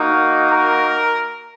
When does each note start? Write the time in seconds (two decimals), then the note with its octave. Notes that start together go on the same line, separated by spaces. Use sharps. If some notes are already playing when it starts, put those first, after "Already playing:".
Already playing: A#3 D#4 F#4
0.51 A#4